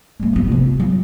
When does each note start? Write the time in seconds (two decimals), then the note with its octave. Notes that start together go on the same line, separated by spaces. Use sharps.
0.20 G3 A#3
0.33 A1 B3
0.47 C3 F3
0.65 F4
0.80 F#3